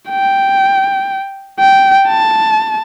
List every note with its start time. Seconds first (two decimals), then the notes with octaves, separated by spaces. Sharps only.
0.10 G5
1.59 G5
2.08 A5